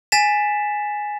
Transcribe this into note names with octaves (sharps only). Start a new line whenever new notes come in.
G#5 A6 B6 E7